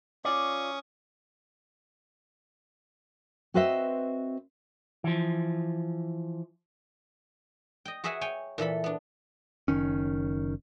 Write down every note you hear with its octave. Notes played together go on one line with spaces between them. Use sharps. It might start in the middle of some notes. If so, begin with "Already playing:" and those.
C#4 F4 D5 C#6 D#6
C4 F#4 B4 C5 D#5 E5
E3 F3
D#5 G5
F#4 G#4 B4 E5 F#5 G#5
C#5 G5 G#5
A#2 E3 A4 B5
B3 D4
F#1 D#3 C#4